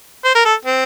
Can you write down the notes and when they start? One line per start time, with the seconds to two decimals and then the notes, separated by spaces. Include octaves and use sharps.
0.25 C5
0.35 A#4
0.45 A4
0.65 C4